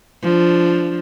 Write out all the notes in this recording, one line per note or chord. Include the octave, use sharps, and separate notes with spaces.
F3 D4